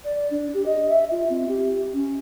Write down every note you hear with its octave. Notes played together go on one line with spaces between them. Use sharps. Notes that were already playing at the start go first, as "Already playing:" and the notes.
D5
D4
G4
D#5
E5
F4
C4
G4
C#4